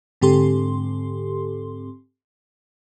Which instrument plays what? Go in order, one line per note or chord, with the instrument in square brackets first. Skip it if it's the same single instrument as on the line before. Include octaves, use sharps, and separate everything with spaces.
[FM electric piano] G#2 D3 C4 G4 A4 C6